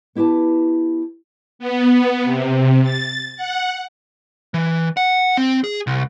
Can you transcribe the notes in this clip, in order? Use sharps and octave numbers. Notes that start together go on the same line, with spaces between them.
B3 E4 G4 B4 A5
B3
C3
A6
F#5
E3
F#5
C4
G#4
C2